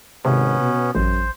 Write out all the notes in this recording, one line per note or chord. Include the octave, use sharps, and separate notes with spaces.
G#1 C3 B3 C#4
B2
A1 F#2 C5